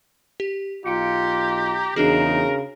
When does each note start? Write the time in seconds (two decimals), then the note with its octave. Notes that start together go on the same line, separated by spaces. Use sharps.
0.40 G4
0.86 B1 F4 G4 D#5 A#5 C#7 D7
1.96 E2 C#3 D4 D#4 F#4 G#4 A#4